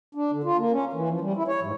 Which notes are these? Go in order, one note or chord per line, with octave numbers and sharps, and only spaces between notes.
D4
D3
F4
A#3
C#4
E3
F3
G3
E4
C#5
G#2